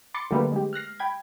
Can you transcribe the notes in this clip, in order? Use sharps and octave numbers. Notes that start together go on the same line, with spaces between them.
B5 C6 D6 A6 C#7
D3 F#3 G3 A3 A#3 B4
G#3 G4
F6 F#6 A#6 C7
G5 B5 G#6